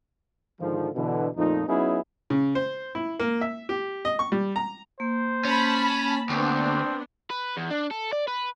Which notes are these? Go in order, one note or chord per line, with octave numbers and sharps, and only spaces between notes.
G#2 D3 D#3 F3
B2 D3 E3
F2 A#2 F3 A3 D#4
F#3 B3 C#4 D#4 E4 G#4
C#3
C5
E4
A#3
E5
G4
D#5
C#6
G3
A#5
A#3 C5
C#4 A5 B5
D2 B3 C4 D4
B4
E2
D4
A4
D5
B4